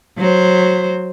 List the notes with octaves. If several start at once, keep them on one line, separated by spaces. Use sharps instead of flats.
F#3 C5